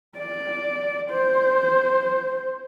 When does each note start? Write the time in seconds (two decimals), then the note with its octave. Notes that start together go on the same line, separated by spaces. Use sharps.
0.17 D5
1.10 C5